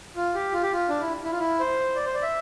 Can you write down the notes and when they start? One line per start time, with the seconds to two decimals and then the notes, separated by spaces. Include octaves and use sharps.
0.16 F4
0.35 G4
0.53 F4
0.63 G4
0.72 F4
0.89 D4
1.00 E4
1.24 E4
1.32 F4
1.40 E4
1.60 C5
1.96 D5
2.06 C5
2.14 D5
2.22 E5